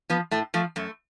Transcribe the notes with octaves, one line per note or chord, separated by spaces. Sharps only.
F3 B3
A2 A3
F3 A3
F#2 A3